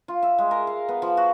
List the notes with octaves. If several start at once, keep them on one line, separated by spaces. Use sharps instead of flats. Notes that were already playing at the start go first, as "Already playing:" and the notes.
F4
E5
G#3
A#4
F5
B3
F3
F#4